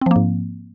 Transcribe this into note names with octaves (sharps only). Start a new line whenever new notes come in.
G#2 F3 A#3 C4